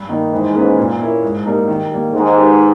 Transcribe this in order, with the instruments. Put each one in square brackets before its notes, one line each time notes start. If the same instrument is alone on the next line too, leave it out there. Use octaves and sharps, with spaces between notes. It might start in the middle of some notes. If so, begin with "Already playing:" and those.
Already playing: [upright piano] G2
D#3 A#3 D#4
[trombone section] G#2 [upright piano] E3
[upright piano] A#3 C#4 G#4 B4
A#2
A#3 E4 A#4 C#5
G#2
G3 A#3 D#4 A#4
D#3
G3 A#3
[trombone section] G#2 [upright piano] D#3
[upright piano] G#3 D#4 G4 B4